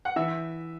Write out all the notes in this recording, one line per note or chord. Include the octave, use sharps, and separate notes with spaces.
F#5
E3 E5